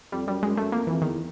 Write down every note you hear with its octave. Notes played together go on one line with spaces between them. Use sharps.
F2 G3
F#2 G3
F#2 G#3
F#2 A3
F2 A#3
F2 E3
E2 D#3